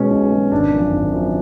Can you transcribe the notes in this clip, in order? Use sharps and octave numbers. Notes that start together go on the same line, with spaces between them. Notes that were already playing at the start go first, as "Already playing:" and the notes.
Already playing: B2 G#3 C#4
B1
B2 G#3
G#1 D4
F#2 F3
G#1
F#2 F3